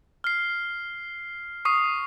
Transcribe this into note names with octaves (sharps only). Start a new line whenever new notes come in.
F6 C7
C#6 D#6 C7